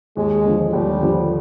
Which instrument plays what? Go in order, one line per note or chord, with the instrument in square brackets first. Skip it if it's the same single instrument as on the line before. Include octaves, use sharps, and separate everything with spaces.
[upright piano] D#2 [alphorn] G#3
[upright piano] D3 F3
[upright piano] D#2 [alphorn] G3
[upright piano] D3 F3